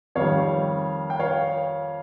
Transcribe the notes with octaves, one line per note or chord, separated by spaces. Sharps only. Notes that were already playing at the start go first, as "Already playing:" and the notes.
F2 D#3 G3 C#5 F5
G5
C#5 F5